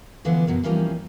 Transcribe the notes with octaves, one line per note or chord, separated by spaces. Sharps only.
D3 E3 F3 A3 B3 D4
F#2 B2 F#3
E3 F3 G3 A#3 C#4 D#4